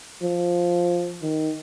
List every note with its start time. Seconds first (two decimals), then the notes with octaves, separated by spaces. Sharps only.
0.22 F3
1.22 D#3